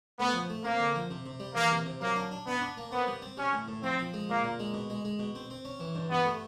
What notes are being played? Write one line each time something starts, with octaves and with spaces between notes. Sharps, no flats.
A3 B3
F3
A3
A#3 C4
D3
F3
C3
C3
G3
E3 A#3
C3
C3
F#3 A#3
D4
D4
B3 D4
D4
A#3
B3 C4
G3
C4
G3 C#4
A2
A2
F3 C4
F3
G#3
A#2 A#3
A#2
G#3
B2
G#3
G#3
B2
C4
C4
C#4
E3
G2
G2 B3
A3